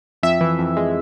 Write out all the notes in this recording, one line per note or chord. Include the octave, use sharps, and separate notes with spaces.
F2 E5
E3
F2
G#3